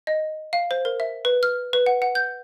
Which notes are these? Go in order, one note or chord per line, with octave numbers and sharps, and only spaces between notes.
D#5
F5
C5
A#4
E5
B4
F6
B4
F#5
F#5
G6